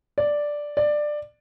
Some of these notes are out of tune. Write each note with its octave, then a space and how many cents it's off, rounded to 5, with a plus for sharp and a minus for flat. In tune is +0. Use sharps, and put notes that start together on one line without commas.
D5 +0
D5 +15